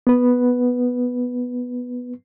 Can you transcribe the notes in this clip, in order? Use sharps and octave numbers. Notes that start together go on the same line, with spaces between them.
B3 B4